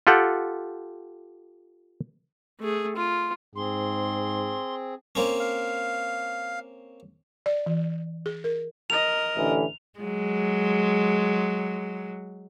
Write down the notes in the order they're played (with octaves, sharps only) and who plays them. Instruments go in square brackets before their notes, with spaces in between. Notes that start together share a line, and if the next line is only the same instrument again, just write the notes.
[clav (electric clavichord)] F4 G4 A4 F#5 G5
[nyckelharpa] A3 G#4
F4
[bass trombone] G#2 [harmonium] C4 G#4 [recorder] C6
[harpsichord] A#3 C4 C#4
[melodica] F5
[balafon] D5
E3
G#4
A#4
[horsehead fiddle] A#4 D#5 [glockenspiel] F7
[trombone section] A1 D3 E3
[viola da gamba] F#3 G#3